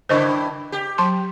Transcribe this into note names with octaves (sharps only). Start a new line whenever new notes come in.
G2 C#3 E4 C5 D#5 C#6
G4
F#3 A5 C6